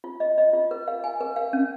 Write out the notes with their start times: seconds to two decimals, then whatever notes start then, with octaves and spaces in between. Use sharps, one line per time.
0.04 F4
0.20 D#5
0.38 D#5
0.53 F4
0.71 A#4
0.88 F5
1.04 G#5
1.21 A#4
1.36 F5
1.53 C#4